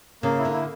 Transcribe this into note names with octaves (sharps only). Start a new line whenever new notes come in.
C#3 A#3
E4
D3
E4